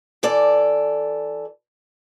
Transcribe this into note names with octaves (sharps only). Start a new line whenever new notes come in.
E3 A4 D5